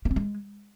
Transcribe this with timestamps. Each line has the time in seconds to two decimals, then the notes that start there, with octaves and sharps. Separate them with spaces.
0.05 A#3
0.11 C4
0.16 G#3